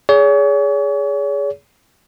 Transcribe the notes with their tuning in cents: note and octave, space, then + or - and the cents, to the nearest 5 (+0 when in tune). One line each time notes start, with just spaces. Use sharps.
G#4 +0 C#5 +40